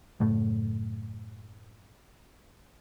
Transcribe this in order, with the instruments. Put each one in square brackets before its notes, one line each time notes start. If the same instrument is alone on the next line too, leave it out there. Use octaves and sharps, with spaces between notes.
[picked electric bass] F#1 A2 A3